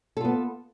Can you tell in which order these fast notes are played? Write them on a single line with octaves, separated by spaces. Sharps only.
A4 F4 B3